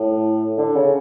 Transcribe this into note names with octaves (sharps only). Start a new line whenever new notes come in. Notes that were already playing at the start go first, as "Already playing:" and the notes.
Already playing: A2
D3
C#3